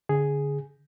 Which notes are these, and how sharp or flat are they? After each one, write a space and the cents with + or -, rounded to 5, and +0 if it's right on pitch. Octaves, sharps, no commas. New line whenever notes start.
D3 -25 G#4 +0